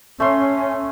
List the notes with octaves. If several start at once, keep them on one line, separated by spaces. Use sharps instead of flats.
A3 C#4 C6